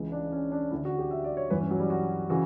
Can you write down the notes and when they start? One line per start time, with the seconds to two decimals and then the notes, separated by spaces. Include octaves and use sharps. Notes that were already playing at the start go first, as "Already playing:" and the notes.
Already playing: C#2 C#3 E3
0.12 D4
0.32 C#4
0.52 D4
0.71 D2 D3 E4
0.85 F#4
0.99 G4
1.11 E5
1.24 D5
1.37 C#5
1.50 G2 E3 B4
1.61 C#4
1.71 F#3
1.80 G3
1.90 F#4
2.30 C#3 E3 F#4